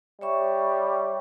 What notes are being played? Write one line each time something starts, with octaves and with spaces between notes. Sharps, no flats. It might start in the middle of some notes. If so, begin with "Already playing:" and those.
G3 C#5 E5 C#6